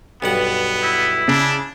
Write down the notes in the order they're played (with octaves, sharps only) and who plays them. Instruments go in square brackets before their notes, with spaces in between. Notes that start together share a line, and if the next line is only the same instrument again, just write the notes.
[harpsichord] B1 G2 F#5 [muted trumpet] B3
[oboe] E4
[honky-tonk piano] C#3 [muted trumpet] D4